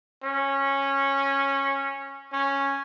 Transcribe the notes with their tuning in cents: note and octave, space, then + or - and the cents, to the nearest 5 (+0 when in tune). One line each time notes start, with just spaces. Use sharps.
C#4 -10
C#4 -5